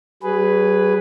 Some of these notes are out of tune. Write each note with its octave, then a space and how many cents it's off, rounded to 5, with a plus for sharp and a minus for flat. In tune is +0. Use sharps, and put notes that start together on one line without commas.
F#3 +45 G#4 +0 B4 +0